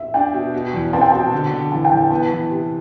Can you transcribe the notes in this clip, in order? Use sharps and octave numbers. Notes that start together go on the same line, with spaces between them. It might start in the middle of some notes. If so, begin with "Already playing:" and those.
Already playing: E5
D4 G5
B2
B2
E2
C4 A5
G5
B2 A5
D3
D3
E3 A5
G5
E3
G5
B3 A5
E3
C3